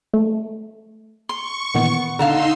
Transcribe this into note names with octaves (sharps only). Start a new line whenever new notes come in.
A3
C6 C#6
A#2 D#3 E3 B3
D3 D#4 F5 A5 A#5 C6 E6